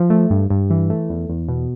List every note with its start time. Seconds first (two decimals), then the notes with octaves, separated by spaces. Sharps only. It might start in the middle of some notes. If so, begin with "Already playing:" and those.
Already playing: F3
0.10 A3
0.30 G2
0.50 G2
0.70 E3
0.90 A3
1.10 E2
1.29 E2
1.49 B2